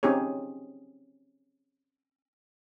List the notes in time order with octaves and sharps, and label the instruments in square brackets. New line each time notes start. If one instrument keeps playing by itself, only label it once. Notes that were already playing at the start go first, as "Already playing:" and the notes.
[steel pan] C4 C#4 D#4 G4 G#4 C#5